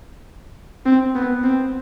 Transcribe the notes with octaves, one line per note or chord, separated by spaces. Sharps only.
C4
B3
C4